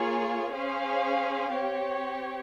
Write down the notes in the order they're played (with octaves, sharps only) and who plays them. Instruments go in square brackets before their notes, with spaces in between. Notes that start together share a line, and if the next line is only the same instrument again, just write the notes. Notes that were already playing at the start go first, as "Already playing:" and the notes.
Already playing: [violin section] A#3 F4 G#4 C#5
C#4 G#4 C5 F5
C4 G4 C#5